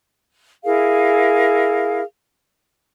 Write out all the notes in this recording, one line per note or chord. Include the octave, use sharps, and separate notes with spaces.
E4 G#4 A#4 F5